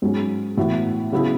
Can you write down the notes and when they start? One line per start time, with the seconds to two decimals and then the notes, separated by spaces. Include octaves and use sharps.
0.02 G#2 F#3 C#4
0.57 A2 E3 B3 F#4
1.12 C#3 F#3 B3 E4 G#4